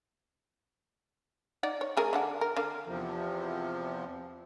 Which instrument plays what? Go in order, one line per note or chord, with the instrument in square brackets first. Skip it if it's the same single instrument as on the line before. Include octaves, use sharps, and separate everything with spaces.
[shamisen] D#4 D5 F#5
C#5
A3 G#4 A#4
D3 D4 F#5
A#4
D3 A#4 F5
[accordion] E2 C3 F3